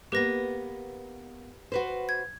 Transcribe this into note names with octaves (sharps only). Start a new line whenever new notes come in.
A#3 B3 G4 B4 A#6
F#4 B4 C5
G#6